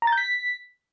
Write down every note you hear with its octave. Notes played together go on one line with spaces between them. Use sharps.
A#5
A6
G6
B6